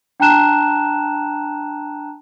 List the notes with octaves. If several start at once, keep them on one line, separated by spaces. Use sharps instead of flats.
D4 G5 A5 A#5 F#6 E7